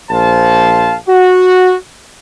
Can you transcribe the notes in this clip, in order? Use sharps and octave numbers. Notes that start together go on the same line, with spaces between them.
A#1 C5 F5 A5
F#4